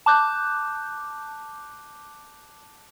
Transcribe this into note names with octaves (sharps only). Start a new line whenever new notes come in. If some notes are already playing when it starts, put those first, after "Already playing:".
A5 D6 F#6 G6